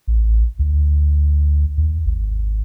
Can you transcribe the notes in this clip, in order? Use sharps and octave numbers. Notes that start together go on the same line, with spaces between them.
A1
D2
D#2
G#1